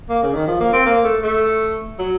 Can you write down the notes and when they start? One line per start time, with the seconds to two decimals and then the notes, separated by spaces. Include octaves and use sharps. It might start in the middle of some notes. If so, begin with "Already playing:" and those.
0.09 A#3
0.23 C#3
0.35 D#3
0.47 F3
0.60 A#3
0.73 C4
0.86 A#3
1.04 A3
1.23 A3
1.99 F#3